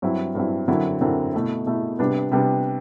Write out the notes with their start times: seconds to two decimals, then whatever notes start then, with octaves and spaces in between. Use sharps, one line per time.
0.02 G2 F#3 C4 E4
0.35 G2 F#3 C4 E4
0.68 F#2 D3 F#3 C4 E4
1.01 F#2 D3 F#3 C4 E4
1.34 B2 A3 E4
1.66 B2 A3 E4
1.99 C3 G3 B3 D4
2.31 C3 G3 B3 D4